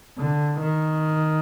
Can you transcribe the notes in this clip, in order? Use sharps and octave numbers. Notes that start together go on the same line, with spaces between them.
D3
D#3